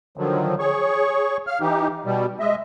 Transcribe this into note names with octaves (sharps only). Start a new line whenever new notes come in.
D3 D#3 F3 F#3
G#4 C#5 C#6
F5 F6
E3 D#4 G4
B2 G3
G#3 D#5 E5